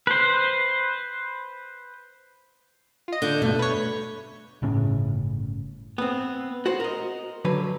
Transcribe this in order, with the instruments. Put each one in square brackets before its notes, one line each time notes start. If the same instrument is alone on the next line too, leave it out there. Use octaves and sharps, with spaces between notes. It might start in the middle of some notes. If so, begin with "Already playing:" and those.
[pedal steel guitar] B4 C5
[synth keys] F4 D#5
[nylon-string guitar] D3 [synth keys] G6
[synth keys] G2 B2 [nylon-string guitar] A3
[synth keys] B4 C#5
[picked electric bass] G1 A2 C#3 C#4
[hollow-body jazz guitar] B3 C4
F#4 C5
A#4 D#5
D3 F#3 B4